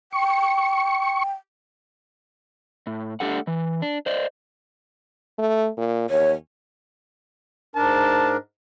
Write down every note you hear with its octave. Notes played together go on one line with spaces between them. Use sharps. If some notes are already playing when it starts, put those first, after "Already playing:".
G5 C#6
A2
A3 D4 G4 A4 F#5
E3
D4
C5 D5 D#5
A3
A#2
D#2 C#5
G#2 D4 A#4 A5